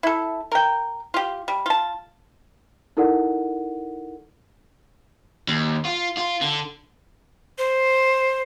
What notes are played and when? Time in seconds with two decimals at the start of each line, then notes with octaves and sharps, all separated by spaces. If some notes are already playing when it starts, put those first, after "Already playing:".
0.03 E4 A4
0.52 A#4 G5
1.14 F4 G4
1.48 G3
1.66 F4 A5
2.97 D#4 E4 A4 A#4 D5 F#5
5.48 D#2
5.85 F4
6.17 F4
6.41 D3
7.58 C5